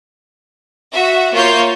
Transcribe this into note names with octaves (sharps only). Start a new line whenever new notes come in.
F#4 E5
A#3 F4 C#5 G6